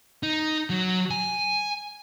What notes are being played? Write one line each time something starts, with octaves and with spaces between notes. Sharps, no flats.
D#4
F#3
G#5